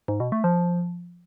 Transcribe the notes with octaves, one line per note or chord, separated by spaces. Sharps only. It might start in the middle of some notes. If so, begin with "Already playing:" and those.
G#2
B2
A3
F3